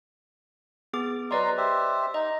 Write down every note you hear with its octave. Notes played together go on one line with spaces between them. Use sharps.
B3 G#4 D6
F#3 B4 D5 D#5 A#5 C6
G4 C5 E5
D#4 D#5